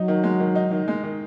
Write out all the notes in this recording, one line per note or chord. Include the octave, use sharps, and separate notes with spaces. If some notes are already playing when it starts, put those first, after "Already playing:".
Already playing: F#3 D#4
D#3
G#3
D#3
D#4
D#3
G#3
D#3